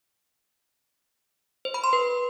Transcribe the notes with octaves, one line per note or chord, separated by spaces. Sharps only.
C5
B5
C6
B4